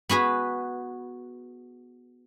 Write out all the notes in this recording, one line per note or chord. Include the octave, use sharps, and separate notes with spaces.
B3 F#4 G#4 B4